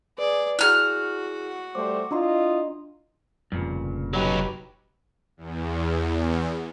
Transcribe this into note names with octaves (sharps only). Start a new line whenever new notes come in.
G#4 B4 D5
E4 F#4 G#4 F6 F#6
G3 A3 C5 D6
D4 E4 F4 D#5 A#5 C6
F1 G2 A#2 C#3
F#3 D#4 G4 B4
E2